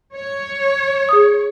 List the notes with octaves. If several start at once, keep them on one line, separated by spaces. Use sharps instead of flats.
C#5
G#4 D#6